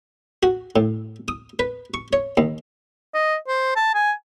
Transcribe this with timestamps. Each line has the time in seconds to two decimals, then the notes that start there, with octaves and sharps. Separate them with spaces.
0.43 F#4
0.76 A2
1.28 D#6
1.59 B4
1.94 C#6
2.13 C#5
2.37 D#2
3.14 D#5
3.48 C5
3.76 A5
3.94 G#5